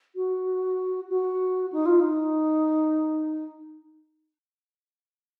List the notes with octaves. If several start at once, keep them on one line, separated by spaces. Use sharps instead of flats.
F#4
F#4
D#4
F4
D#4